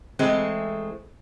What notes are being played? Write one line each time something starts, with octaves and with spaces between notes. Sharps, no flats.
E3 G#3 A3 C4